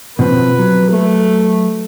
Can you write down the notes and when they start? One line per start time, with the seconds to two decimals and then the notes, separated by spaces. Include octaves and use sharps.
0.19 B2 F3 C4 B4
0.59 F#3
0.90 A3